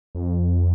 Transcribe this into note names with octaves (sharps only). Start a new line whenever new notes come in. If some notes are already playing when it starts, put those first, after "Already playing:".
F2